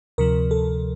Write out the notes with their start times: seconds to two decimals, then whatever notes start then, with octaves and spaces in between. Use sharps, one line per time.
0.18 D2 C3 F3 A#4
0.51 A4